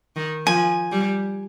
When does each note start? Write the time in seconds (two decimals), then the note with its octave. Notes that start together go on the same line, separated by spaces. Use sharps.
0.16 D#3
0.46 F3 G#5
0.91 G3